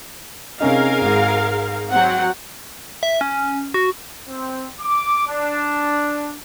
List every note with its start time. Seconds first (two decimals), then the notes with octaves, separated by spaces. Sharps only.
0.60 C3 C#4 D#4 G#4 A#4 F5
1.01 G#1 G#2
1.91 F#3 C4 F#5
3.03 E5
3.21 C#4
3.74 F#4
4.28 C4
4.80 D6
5.26 D4